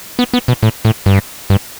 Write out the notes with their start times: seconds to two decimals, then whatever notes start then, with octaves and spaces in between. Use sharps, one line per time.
0.19 B3
0.33 B3
0.48 B2
0.63 A2
0.85 A2
1.06 G2
1.50 G2